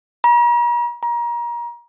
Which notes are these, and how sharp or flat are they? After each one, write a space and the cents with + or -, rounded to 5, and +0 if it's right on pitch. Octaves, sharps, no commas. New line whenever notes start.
A#5 +45
A#5 +30